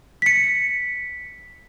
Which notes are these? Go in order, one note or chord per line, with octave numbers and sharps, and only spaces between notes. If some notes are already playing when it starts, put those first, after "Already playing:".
B6 C#7